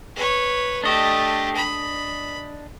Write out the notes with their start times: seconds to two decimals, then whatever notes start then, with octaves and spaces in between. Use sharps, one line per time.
0.16 B4 C#5
0.84 A3 D4 G4 D#5
1.55 B5